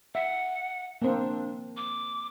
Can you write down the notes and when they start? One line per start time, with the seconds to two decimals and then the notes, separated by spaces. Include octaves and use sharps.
0.15 E5 F#5
1.02 A#3 C4 D4
1.77 D6